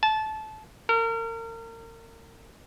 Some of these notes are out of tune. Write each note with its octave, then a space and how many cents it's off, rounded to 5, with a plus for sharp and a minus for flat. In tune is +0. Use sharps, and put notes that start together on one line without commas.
A5 -20
A#4 -35